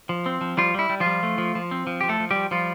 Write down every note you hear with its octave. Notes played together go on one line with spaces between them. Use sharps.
F3
C4
F3
F3 G3 F4
G3 E4
G3
F3 F4
G3
A3
F3
F3
C4
F3
F3 G4
A3 A4
F3
F3 G3 G4
F3 G3 F4